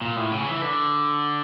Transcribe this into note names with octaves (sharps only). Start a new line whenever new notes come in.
A#2
A2
C#3
E3
D3